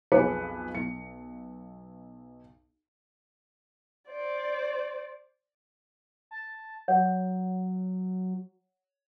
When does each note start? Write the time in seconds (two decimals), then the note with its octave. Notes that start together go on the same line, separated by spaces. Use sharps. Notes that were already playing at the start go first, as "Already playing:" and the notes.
0.12 B1 F2 G#4 B4 D6 C#7
0.75 B1 C#7
4.10 C5 D5
6.31 A5
6.88 F#3 C#5 F#5